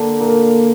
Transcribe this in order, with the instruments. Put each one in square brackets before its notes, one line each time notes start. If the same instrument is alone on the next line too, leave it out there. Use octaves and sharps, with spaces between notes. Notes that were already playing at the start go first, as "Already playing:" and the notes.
Already playing: [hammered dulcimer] D3 [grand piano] A#3
[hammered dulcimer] A#2 [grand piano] A#3